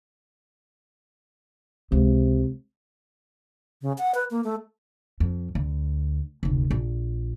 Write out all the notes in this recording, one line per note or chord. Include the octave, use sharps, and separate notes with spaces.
C#2 C3
C#3
F#5
B4
A#3
A3
F2
D2
F1 D2
A#1